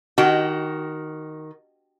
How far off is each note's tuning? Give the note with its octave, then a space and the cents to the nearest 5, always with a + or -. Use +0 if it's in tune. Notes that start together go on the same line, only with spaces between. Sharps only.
D#3 +0 F#4 +25 G5 +0